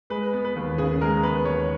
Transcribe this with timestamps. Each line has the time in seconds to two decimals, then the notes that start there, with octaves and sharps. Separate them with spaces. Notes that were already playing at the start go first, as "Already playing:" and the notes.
0.10 G#3 B4
0.33 B3
0.45 B4
0.56 D#2
0.78 C#3 G#4
1.01 G#3 A#4
1.23 B3 B4
1.45 D#2 C#5